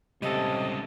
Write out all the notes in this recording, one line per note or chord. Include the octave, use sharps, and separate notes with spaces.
C#2 C3 G3 C#4 A4 D#5